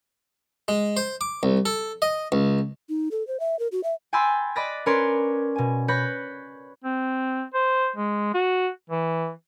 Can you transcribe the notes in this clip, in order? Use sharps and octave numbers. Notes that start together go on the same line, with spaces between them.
G#3
C5
D6
C2
A4
D#5
C#2
D#4
A4
C5
E5
A#4
F#4
E5
G5 G#5 B5 C6 E6 A6
D5 D#5 B5 F#6 A6 A#6
C#4 A#4 B4 C#5 D5 C6
B2 G#5
B4 C#5 B5 F#6 G6 A#6
C4
C5
G#3
F#4
E3